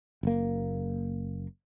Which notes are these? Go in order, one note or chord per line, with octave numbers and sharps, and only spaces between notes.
F#1 A#3